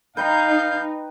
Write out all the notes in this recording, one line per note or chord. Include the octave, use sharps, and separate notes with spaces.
D#4 B4 F5 G5 A#5 G6